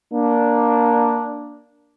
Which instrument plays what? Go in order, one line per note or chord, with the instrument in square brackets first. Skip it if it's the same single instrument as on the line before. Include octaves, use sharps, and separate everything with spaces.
[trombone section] A#3 D4